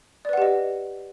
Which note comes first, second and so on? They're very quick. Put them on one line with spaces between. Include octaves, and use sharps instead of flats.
D5 B4 F#5 G4 D#5